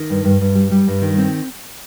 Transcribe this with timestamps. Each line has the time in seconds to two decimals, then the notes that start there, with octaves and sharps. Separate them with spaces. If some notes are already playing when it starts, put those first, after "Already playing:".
Already playing: D#3
0.10 G2
0.25 G2
0.41 G2
0.55 G3
0.71 G3
0.87 G2
1.02 D#3
1.18 C4